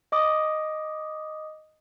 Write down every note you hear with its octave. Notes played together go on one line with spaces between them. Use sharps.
D#5 D6 D#6